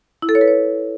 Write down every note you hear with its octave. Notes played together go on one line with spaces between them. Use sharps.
E4
A4
C#5
B4
C#5